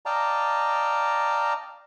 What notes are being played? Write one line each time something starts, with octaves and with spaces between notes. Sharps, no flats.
D5 D#5 F5 G5 A5 A#5